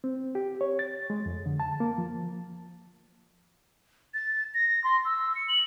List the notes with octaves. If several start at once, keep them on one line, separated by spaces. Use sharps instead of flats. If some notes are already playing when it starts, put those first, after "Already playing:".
C4
G4
C#5
A6
G#3
F2
D3
A5
A#3
F3
A6
A#6
C6
E6
C#7
F#7